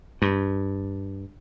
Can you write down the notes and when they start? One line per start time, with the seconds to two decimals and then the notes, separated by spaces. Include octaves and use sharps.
0.22 G2